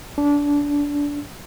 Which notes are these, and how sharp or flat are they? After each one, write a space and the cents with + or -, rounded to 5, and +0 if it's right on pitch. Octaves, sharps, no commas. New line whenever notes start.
D4 -20